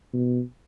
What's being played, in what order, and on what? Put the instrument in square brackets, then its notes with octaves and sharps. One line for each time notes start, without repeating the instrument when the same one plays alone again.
[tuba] B2